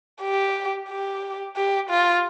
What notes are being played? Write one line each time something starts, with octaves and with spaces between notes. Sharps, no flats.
G4
G4
G4
F4